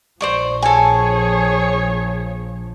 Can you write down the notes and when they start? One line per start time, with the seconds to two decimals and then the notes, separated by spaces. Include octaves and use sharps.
0.21 A#1 F3 C5 D5 C#6
0.62 G#4 A4 C#5 G#5